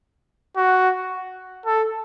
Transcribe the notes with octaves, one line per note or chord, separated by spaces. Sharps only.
F#4
A4